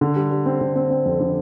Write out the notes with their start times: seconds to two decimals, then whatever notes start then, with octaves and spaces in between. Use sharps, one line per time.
0.01 D3
0.16 G3
0.31 G3
0.46 C4
0.61 D3
0.76 C4
0.90 C4
1.06 F2
1.20 D3